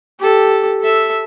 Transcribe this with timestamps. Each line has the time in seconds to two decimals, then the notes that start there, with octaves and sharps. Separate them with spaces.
0.20 G4 A4
0.81 A4 E5